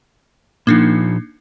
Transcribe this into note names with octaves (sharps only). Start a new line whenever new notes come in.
A#2 F3 A#3 D4 D#4